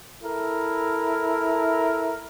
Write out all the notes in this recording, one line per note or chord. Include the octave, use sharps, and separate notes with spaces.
E4 A4 A#4